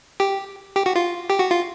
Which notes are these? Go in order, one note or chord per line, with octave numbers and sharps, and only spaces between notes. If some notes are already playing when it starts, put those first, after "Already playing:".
G4
G4
F#4
F4
G4
F#4
F4